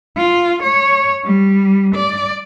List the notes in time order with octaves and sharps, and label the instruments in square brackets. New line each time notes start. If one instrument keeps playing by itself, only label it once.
[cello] F4
C#5
G3
D5